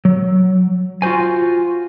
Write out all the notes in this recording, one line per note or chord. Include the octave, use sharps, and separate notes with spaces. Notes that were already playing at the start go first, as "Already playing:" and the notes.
F#3
F4 F#4 G#4 C5 G#5